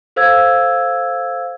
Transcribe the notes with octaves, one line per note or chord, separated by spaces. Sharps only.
A4 C5 F5 E6 G#6